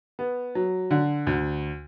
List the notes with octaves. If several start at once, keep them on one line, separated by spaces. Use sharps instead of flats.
B3
F#3
D3
D2